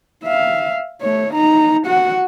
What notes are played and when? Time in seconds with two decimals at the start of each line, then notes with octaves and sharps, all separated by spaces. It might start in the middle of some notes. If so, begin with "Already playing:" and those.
0.23 E5 F5
1.01 A3 C#5
1.34 D#4 A#5
1.86 F#4 F#5